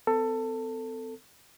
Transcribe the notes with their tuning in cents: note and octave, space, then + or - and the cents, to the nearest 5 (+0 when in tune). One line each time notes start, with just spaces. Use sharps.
C4 -45 A4 +20